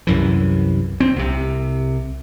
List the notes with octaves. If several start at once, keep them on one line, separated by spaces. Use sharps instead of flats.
C2 F#2 E3
C4
C2 C3